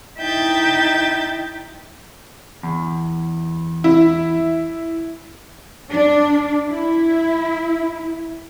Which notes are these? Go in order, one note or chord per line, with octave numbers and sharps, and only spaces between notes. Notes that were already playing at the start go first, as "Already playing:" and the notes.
D#4 E4 E5 G5 G6 A6
E2
E4
D4
E4